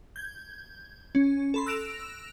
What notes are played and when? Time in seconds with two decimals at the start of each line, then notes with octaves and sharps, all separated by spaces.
0.16 G6 G#6
1.15 C#4
1.54 A4 B5 C6
1.66 E6 F#6 A#6 D7 E7 F7